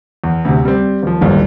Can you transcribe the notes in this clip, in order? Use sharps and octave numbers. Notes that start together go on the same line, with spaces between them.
E2
D2 C3
G3 C4
D#2 F3
D1 G1 D#2